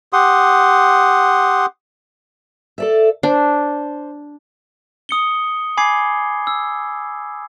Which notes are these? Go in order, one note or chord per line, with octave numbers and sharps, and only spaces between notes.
G4 F#5 C6 D#6
A4 D5 E5
D4 C5
D#6 C#7 G7
G#5 B5 D6 G#6 C7
E6